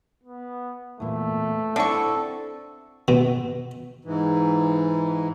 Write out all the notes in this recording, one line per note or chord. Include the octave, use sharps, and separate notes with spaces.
B3
E2 A#2 A3
D3 C4 E4 A4 C#6
B2
G#2 E3